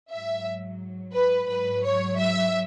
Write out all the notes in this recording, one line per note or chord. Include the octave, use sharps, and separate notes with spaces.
G#2 F#3 E5
B4
G#2 F#3 B4
C#5
E5